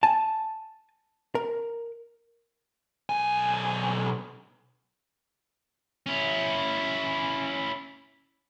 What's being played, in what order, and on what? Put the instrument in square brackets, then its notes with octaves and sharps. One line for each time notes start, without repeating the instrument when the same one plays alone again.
[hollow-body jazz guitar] G#5 A5
A#4
[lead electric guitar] B1 G#5
[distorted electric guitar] C#4 E4